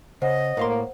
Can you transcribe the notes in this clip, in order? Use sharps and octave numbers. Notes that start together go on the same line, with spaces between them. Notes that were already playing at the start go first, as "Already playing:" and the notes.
C#3 C5 D#5 F#5
A2 A#3 F5 C6